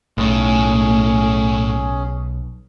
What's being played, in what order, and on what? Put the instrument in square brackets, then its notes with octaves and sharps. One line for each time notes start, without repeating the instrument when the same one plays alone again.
[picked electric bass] B1 [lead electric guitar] A2 [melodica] C#4 G#4